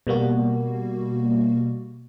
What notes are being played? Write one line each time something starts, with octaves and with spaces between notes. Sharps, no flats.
B2 G3 A#3 F#4